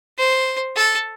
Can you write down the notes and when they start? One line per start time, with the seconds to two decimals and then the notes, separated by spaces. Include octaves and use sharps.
0.18 C5
0.76 A4